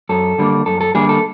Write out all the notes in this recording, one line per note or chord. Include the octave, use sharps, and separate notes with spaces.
F#2 A4
D3 G3 A#3
F#2 A4
A4
D3 G3 A#3 G#4
A4